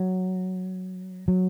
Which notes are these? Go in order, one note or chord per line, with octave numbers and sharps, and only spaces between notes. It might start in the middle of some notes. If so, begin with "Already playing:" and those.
Already playing: F#3
F#3